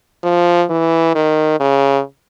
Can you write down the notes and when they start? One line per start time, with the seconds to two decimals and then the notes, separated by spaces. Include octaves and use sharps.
0.24 F3
0.70 E3
1.15 D#3
1.60 C#3